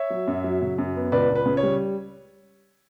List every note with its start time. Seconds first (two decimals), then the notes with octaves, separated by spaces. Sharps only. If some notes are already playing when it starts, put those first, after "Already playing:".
Already playing: C#5 E5
0.10 F#3
0.27 F#2
0.44 F#3
0.62 C#3
0.78 F#2
0.96 B3
1.12 C#2 B4 D5
1.30 C#2
1.35 B4
1.46 C#3
1.57 C#5
1.63 G3